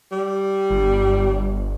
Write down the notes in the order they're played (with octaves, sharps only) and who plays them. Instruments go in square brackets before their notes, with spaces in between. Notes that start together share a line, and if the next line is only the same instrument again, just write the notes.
[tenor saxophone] G3
[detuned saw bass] G1